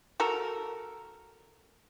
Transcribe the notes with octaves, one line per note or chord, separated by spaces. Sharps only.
F#4 A4 A#4